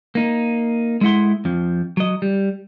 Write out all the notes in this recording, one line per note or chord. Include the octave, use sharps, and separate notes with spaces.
A#3 D#4
G#3 A3 E4 F#5 C6
F2 F3
F#3 D#5
G3